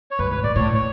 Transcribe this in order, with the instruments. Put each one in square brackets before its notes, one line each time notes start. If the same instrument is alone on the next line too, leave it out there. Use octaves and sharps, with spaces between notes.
[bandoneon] C#5
[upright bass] F#2 [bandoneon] B4
[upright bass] G#2 [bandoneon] B4
[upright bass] A2 [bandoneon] D5
[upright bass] A2 [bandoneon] C#5
[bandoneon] C#5